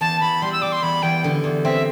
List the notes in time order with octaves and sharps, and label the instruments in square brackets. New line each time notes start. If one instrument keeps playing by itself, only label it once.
[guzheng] E2 [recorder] A5
[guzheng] E2 [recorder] B5
[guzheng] G3 [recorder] C6
[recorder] E6
[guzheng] G3 [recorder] D6
[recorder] C6
[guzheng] E2 [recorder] B5
[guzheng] E2 [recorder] G5
[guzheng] D3
E2
[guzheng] C4 [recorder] E5